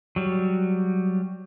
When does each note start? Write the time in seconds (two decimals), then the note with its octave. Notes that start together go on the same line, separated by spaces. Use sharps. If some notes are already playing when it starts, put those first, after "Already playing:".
0.16 F#3 G3